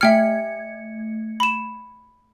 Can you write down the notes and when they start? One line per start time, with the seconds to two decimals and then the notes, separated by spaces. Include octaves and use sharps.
0.01 A3 E5 G5 F6 G#6 C#7
1.40 B5 E7